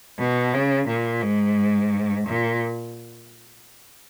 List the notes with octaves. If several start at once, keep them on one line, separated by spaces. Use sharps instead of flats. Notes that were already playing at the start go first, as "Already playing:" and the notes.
B2
C#3
A#2
G#2
A#2